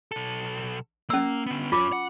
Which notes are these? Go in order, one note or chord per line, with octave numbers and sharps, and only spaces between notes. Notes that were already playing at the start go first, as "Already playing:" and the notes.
B1 A4
A#3 C#4 E6
D3 B3
F#2 C#4 F4 D6
F#5